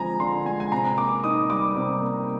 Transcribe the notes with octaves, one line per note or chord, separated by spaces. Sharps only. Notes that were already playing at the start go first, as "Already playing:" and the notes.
Already playing: D3 F3 G#3 C4 G#5 A#5
D3 C6
G#3 G#5
G#5
C3 A#5
A#3 D6
D#4 D#6
G3 D6
C3
A#3